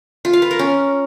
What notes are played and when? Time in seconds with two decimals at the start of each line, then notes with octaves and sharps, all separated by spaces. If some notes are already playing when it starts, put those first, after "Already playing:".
0.25 F4
0.33 F5
0.42 B4
0.51 A#4
0.59 C#4